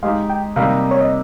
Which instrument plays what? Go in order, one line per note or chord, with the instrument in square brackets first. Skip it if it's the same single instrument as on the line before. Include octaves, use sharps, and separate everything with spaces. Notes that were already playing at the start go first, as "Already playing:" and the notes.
[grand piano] G#3 D#4 G4 [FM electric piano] F5
[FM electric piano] G5
[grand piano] C3 G3 A#3 D#4 G4 [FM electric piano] F5
[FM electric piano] C#5
D#5